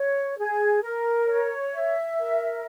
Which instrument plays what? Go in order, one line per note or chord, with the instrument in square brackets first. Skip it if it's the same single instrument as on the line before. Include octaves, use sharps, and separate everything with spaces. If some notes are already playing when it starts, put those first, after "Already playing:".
Already playing: [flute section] C#5
G#4
A#4
C#5
E5
A#4